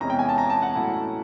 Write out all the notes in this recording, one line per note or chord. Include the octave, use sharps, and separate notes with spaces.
E2 C3 E3 G#3 C#4 A#5
G5
G#5
A5
A#5
A5
F#5
A2 F#3 A3 C#4 E4